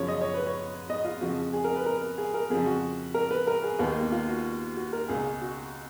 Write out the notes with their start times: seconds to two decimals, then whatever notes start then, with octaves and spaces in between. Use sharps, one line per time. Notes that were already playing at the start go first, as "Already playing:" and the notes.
Already playing: F#2 C#3 F3 C#5
0.08 D#5
0.21 C#5
0.34 B4
0.47 C#5
0.90 D#5
1.05 F4
1.21 F2 C#3 F3 F#4
1.53 G#4
1.64 A#4
1.76 B4
1.86 A#4
2.18 G#4
2.34 A#4
2.50 F2 C#3 F3 G#4
2.66 F#4
3.14 A#4
3.31 B4
3.47 A#4
3.64 G#4
3.79 D#2 D#3 B3
3.96 A#3
4.12 F4
4.29 F#4
4.77 F#4
4.93 A#4
5.08 C#2 B2 G#4
5.41 F#4